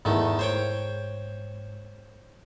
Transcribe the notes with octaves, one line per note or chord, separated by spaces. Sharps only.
E2 G#2 D#3 A3
C5 C#5 G5